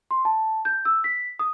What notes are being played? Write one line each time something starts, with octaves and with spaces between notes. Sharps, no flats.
C6
A5
G6
E6
B6
D#6